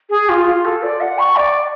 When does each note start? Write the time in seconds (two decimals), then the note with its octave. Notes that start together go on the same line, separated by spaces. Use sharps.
0.10 G#4
0.29 F4
0.46 F4
0.65 A4
0.83 D5
1.01 F#5
1.19 C#6
1.36 D5